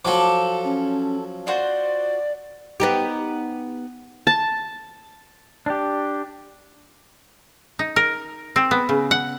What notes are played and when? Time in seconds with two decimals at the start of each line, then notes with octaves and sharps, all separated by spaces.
0.05 F3 F#3 A4 D6
0.65 C#4
1.47 F4 F#4 C5 D5
2.80 B3 D#4 G4
4.27 A5
5.66 D4 G4
7.79 D#4
7.96 A#4
8.56 C4
8.71 B3
8.89 C#3
9.11 F#5